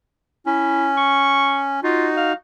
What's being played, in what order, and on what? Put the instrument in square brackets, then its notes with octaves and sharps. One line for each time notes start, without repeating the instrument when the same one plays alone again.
[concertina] C#4 [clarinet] E4
[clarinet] C#6
[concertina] D#4 F#4 [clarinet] F4
[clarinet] F5